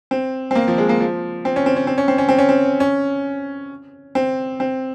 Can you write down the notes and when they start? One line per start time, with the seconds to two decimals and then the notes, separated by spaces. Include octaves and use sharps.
0.11 C4
0.51 C4
0.55 A#3
0.68 F3
0.78 G#3
0.89 A#3
1.00 F3
1.45 C4
1.56 C#4
1.66 C4
1.76 C#4
1.87 C4
1.98 C#4
2.08 C4
2.18 C#4
2.29 C4
2.38 C#4
2.49 C4
2.80 C#4
4.15 C4
4.60 C4